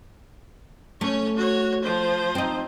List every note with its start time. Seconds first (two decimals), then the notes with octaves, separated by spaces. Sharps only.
1.01 A3 C#4 C#5
1.37 F#4 C#5
1.83 F3 C5
2.35 C4 D#4